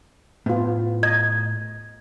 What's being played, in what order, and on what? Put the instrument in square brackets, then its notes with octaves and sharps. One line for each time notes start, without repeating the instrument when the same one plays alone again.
[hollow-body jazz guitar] A2 [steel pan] B3 F4
[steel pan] D#5 [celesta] G#6